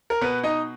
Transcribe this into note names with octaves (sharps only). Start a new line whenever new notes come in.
A#4
B2 B3 B4
D#4 D#5